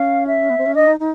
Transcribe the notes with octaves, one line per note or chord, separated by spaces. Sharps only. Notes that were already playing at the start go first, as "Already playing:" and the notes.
Already playing: C#4 F5
E5
B3
C4
C#4
D4 D#5
D#4
D#4